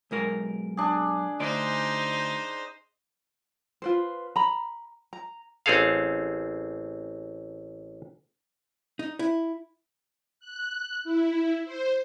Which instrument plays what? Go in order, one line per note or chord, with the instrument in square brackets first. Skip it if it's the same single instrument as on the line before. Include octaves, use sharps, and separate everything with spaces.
[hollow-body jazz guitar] B1 G#3 A#4
[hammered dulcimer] D4 G#4
[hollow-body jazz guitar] D2 D5 C6 [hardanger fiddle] D#4 C5
[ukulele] F4 B4 C5
A#5 B5
A#5
[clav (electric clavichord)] A1 C4 G#4 A4 F5
[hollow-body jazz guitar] D#4
E4
[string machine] F#6
E4
C5